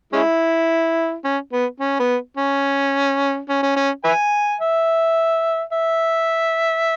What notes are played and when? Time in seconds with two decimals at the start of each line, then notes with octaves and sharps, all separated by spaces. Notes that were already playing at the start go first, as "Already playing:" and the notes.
0.13 G#3 C#4 E4
1.25 C#4
1.53 B3
1.80 C#4
2.00 B3
2.37 C#4
3.49 C#4
3.63 C#4
3.76 C#4
4.04 B4 E5 G#5
4.61 E5
5.73 E5